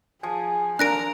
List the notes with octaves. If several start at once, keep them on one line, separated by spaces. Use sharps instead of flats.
F3 G#4 G#5
D4 A#4 A#5 F#6 A#6 D7